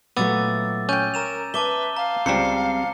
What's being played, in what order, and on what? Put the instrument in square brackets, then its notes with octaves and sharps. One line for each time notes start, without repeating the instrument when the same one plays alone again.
[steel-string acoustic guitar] A#2 F#3 A3 [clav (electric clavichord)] B3 [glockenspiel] D6 E6 A6
[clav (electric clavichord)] C#4 G5 [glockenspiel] G6 D#7
[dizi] A#4 [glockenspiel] A#5 E7 F7
[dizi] B4 [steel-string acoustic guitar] E5 [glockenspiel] A5 D6 G7
[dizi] F5 [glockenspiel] A#5
[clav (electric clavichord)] C#2 G3 [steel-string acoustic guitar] C4 [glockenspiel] A#5 C7 C#7